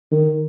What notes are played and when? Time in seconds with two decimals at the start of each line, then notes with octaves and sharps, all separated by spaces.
0.12 D#3